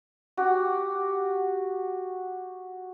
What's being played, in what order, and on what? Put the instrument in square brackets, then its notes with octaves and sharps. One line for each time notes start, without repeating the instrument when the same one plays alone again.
[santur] F#4 G4